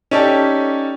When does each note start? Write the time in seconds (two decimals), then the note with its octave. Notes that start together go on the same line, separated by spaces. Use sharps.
0.11 C#4 D#4 G4 A4 D5 A5